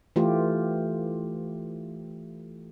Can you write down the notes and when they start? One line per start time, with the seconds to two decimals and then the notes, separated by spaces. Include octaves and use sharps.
0.16 E3 A3 F4 G4